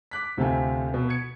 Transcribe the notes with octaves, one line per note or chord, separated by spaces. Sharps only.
D6 F#6 B6
D2 C3 F4 A4 F5 G#5
B2
G#6 C#7